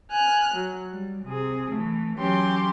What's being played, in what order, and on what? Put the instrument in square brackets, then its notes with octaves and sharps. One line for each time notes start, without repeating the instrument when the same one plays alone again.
[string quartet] G#5 F6 F#6
F#3
G3
C3 G#4
E3 A3
E3 F#3 C#4 G4 C6